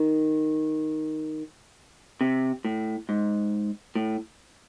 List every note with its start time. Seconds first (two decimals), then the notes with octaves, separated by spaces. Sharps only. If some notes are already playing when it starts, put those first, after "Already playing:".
Already playing: D#3
2.21 C3
2.65 A2
3.09 G#2
3.96 A2